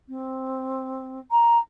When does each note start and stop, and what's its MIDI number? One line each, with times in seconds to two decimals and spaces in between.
0.09 1.19 60
1.31 1.58 82